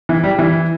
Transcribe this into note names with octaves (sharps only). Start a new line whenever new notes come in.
E3
G3
E3